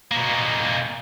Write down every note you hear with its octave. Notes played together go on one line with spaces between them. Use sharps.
B2 A#3